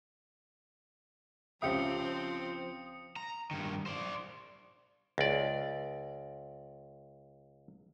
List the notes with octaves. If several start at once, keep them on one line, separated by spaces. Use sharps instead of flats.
C#2 F3 C4 G4 E5 D#6 C#7
A#5
G2 D#3
C5 D5
C#2 D5